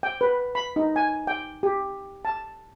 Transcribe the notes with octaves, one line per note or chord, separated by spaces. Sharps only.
G5
B4
B5
D#4
G#5
G5
G4
A5